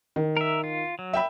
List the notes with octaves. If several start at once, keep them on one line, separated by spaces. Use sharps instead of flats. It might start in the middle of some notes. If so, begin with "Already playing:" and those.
D#3
A#4 E5
F4
F#3
E5 G5 B5